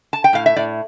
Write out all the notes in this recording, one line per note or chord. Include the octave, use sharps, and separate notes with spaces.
A5
G5
A2 F5
E5
A2 D5